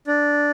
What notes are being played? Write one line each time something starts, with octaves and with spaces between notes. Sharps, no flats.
D4